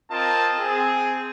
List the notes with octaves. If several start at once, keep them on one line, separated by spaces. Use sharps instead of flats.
C4 F4 A#4 D#5 A5
C4 G#4